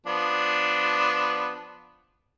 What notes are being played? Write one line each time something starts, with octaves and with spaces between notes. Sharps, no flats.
F3 B3 D4